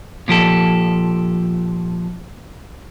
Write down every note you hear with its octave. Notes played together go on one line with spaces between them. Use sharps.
A#2 F3 G4 A4